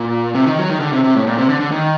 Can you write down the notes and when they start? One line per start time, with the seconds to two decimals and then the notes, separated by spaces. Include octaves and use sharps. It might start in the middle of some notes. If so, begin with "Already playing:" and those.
Already playing: A#2
0.35 C3
0.46 D#3
0.58 F#3
0.70 D#3
0.80 D3
0.93 C3
1.04 C3
1.15 A2
1.27 A#2
1.38 C3
1.49 D3
1.60 D3
1.72 D#3